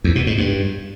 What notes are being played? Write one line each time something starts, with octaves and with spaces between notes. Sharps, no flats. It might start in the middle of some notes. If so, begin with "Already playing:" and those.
E2
B2
G#2
G2